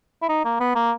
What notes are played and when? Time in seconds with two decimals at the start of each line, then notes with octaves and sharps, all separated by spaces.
0.22 E4
0.29 D#4
0.45 A#3
0.60 B3
0.75 A#3